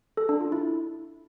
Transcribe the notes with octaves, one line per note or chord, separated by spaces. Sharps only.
A4
D4
F4
E4